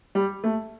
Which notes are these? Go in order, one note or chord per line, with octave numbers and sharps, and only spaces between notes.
G3
A3